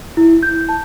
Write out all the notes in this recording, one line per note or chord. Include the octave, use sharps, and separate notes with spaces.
E4
G6
A5